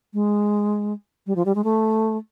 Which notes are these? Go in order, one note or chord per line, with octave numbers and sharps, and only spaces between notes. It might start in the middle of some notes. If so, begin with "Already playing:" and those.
G#3
G3
F3
G3
G#3
A3